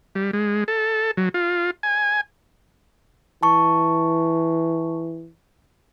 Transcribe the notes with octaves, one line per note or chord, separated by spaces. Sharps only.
G3
G#3
A4
F#3
F4
G#5
E3 A5 C#6